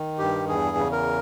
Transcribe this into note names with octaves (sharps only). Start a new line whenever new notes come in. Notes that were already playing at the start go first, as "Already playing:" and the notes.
Already playing: D#3
G2 G4
E2 G#4
C#3
A#4